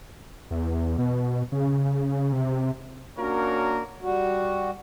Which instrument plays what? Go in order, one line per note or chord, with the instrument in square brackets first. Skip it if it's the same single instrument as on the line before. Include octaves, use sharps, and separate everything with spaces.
[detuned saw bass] E2
B2
C#3
C3
[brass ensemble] A#3 C#4 D4 F#4 A#4 C#5
[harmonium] G3 F#4